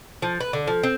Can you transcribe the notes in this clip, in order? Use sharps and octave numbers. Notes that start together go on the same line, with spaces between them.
F3
B4
D3
F3
C4